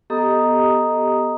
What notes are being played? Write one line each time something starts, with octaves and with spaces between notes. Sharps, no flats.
B3 G4 A4 D#5 A#5 D#6